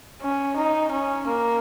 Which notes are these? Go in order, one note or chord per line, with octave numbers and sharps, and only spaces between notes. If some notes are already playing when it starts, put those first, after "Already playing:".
C#4
D#4
C#4
A#3